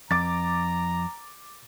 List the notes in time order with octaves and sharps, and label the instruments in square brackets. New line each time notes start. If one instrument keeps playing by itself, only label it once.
[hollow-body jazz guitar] F2 [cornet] A#5 [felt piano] D6 A6